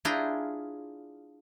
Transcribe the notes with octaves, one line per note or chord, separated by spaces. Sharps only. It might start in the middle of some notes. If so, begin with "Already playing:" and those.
D4 E4 F4 G#4 G5 A#5